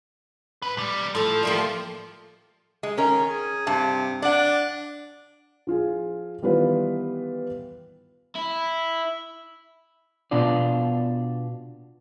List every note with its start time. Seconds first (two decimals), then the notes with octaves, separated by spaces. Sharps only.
0.62 G#2 B4
0.77 B1 G3
1.15 A2 F3 A4
1.43 G3 A3 A#3
2.83 G#3
2.97 D#3 C#4 A#4
3.28 G#4
3.67 G2 C3 A5
4.22 D4 D5 F#5
5.67 F3 F4 G#4
6.42 D#3 E3 G3 B3 F4 B4
8.36 E4
10.31 B2 B3 D4 F4 D5